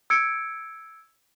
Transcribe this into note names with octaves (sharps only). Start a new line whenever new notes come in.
E6 G#6 C#7 D7